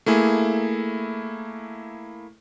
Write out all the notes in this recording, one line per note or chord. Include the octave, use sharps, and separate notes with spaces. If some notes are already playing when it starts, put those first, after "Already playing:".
A3 A#3 E4 G#4